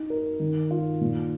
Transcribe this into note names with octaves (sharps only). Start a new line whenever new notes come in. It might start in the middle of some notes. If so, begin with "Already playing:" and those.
Already playing: D#4
A#4
D#3
F4
A#2